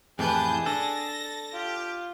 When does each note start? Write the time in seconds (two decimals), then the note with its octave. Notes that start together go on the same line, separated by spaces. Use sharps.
0.19 F2 A2 E3 G4 G#4 B4 A5 G6
0.66 D4 A4 A6 A#6
1.53 F4 G4